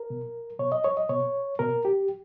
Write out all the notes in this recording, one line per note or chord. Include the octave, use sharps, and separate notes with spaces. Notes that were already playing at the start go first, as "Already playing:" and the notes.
Already playing: A#4
B2
B2 C#5
D#5
C#5
D#5
B2 C#5
B2 A#4
G4